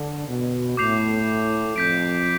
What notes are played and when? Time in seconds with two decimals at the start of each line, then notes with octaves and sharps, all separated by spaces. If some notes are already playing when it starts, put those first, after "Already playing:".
Already playing: D3
0.28 B2
0.77 A2 D6 G6 C7 F7
1.76 F2 G6 B6 D7